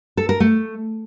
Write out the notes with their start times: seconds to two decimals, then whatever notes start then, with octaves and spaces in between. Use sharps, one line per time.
0.17 A4
0.29 A#4
0.40 A3